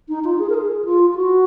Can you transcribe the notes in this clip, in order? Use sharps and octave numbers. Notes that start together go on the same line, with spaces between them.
D#4
F4
G#4
A#4
G#4
F4
F#4